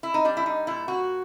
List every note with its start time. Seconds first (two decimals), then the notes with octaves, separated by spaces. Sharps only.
0.03 E4
0.14 D#4
0.25 G3 D4
0.37 E4
0.46 D#4
0.67 A#2 E4
0.88 F#4